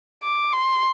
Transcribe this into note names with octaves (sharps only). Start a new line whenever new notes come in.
D6
C6